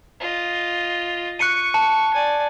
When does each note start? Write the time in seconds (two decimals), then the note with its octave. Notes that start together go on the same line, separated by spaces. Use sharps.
0.20 F4 D#5
1.39 C#6 F#6 C#7 D#7
1.74 A5
2.13 D5 G#5